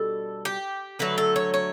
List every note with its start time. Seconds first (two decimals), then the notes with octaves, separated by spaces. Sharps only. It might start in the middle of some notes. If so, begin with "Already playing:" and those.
Already playing: B2 G3 D4 A4
0.45 G4
0.99 D3 F#3 A3 B4
1.18 A4
1.36 C#5
1.54 C#5